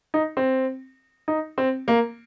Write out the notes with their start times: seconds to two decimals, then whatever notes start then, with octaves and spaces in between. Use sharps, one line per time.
0.14 D#4
0.37 C4
1.28 D#4
1.58 C4
1.88 A#3